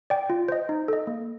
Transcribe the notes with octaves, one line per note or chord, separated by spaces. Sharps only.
D5 G5
F4
C5 D#5
D#4
A4 D#5
A#3